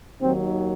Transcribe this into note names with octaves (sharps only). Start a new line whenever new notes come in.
D#2 D#3 F#3 C4